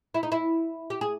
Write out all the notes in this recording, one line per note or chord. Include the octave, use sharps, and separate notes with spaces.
E4
D#4
E4
G4
G#4